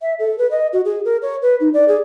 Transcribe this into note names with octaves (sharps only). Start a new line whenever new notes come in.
E5
A4
B4
D#5
F#4
G#4
A#4
C#5
B4
D#4
D5
G#4